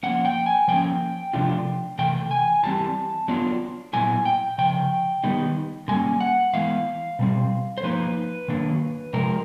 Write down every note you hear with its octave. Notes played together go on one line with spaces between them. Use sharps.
F3 A#3 C#4 F#5
G5
G#5
F3 A#3 C#4 G5
C3 F3 A3 D4 F4
C3 E3 A3 G5
G#5
E3 G3 C4 A5
F#3 B3 D4 F4
A#2 F#3 B3 E4 G#5
G5
C#3 F3 G5
D#3 G3 B3 D#4
D3 G3 A#3 C#4 G#5
F#5
E3 G#3 B3 E4 F5
B2 G3 C4
C5
F3 A#3 D#4 B4
D#3 F#3 A#3 D4
C3 F3 G#3 A#4